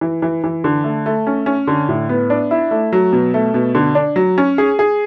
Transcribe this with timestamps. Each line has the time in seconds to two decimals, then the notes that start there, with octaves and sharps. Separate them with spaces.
0.01 E3
0.22 E3
0.44 E3
0.64 D3
0.84 A3
1.06 A3
1.27 C#4
1.46 C#4
1.67 D3
1.89 A2
2.09 B3
2.30 D4
2.51 E4
2.71 A3
2.93 F#3
3.13 B2
3.34 A3
3.54 B2
3.75 D3
3.95 D4
4.16 F#3
4.38 C#4
4.58 G#4
4.79 G#4